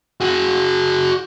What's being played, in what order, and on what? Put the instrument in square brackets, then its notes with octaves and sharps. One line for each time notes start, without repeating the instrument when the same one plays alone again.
[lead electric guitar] F#4 G#4